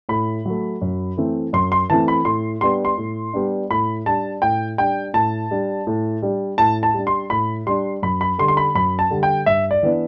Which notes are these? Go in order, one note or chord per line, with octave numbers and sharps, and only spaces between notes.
A2 B5
F#3 A3
F#2
E3 A3 C4
F#2 C6
C6
E3 A3 C4 A5
B5
A2 C6
G3 B3 D4 C6
C6
A2
G3 B3 D4
A2 B5
G3 D4 A5
A2 G5
G3 D4 G5
A2 A5
G3 D4
A2
G3 D4
A2 A5
A5
G3 D4
C6
A2 B5
G3 D4 C6
F#2 B5
B5
D3 G3 C6
C6
B5
F#2 B5
A5
D3 G3
G5
G2 E5
D5
E3 B3 D4